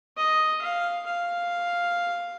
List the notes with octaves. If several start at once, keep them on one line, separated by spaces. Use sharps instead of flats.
D#5
F5
F5